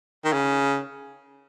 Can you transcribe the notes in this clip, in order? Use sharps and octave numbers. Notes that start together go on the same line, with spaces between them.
D#3
C#3